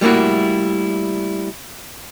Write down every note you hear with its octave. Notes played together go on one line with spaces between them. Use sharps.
G3 A3 A#3 E4 F#4